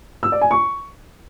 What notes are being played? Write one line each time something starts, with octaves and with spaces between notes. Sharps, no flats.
E6
D5
G#5
C#6